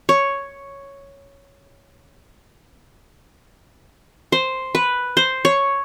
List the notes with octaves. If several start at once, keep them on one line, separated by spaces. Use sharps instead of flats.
C#5
C5
B4
C5
C#5